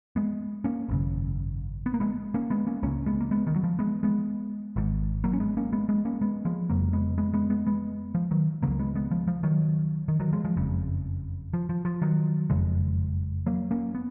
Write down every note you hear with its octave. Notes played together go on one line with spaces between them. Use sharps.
G#3 B3
A#3 C#4
G#1 F#2 C#3
B3
A#3
G#3 B3
A#3 C#4
G#3 B3
A#3 C#4
C#2 C#3 A#3 C#4
G#3 B3
A#3
G#3 B3
D#3
F#3
F3
G#3 B3
G#3 B3
G#1 G#2
F#3 A#3
C#4
G#3 B3
A#3 C#4
G#3 B3
G#3 B3
A#3 C#4
G#3 B3
F3 G#3
F1 F2 C#3 F#3 A#3
G#3 B3
G#3 B3
G#3 B3
G#3 B3
G#3 B3
F3
D#3 F#3
C#2 C#3 F#3 A#3
G#3 B3
G#3 B3
F3
F3
D#3 F#3
D#3
D#3 F#3
F3 G#3
F3 G#3
F#1 F2 C#3
F3
F3
F3
D#3 F#3
F#1 F2 C#3 F3 G#3
F#3 A#3
A#3 C#4
B3